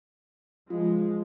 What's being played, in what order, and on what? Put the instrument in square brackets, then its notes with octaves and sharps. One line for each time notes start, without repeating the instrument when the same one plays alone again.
[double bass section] F3 G#3 [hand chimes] F4